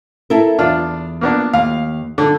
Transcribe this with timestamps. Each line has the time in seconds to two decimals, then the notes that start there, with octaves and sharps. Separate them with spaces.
0.30 E4 A4 A#4
0.59 E2 D4 F4
1.21 A#3 B3 D4
1.53 D#2 F5
2.18 D3 D4